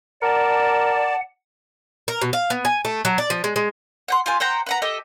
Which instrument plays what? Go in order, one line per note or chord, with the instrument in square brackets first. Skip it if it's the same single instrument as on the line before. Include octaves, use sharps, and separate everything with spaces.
[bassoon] A#4 [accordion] D5 A5 [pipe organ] F#5
[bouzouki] A#4
B2
F5
B3
G#5
A3
F#3
D5
F3
G#3
G#3
[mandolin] F#5 G5 C6
F4 G4 G#5
C5 F#5 G5 A#5
B4 F#5 A#5
G4 A4 D#5